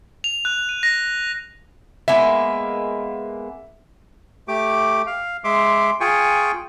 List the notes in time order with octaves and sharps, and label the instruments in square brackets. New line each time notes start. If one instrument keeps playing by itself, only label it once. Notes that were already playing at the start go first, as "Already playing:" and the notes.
[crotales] F7
F#6
D#7
A#6
[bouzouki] G#3 A#3 B3 [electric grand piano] E5
[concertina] A3 G4 D6
F5
G#3 E5 C6 D6
F4 G#4 G5 G#5 C#6